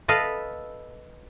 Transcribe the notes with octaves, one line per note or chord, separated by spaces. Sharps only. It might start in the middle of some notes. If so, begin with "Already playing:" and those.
A4 B4 D#5 F5